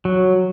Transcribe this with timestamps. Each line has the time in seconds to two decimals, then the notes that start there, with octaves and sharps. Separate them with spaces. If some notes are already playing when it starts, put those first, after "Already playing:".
0.05 F#3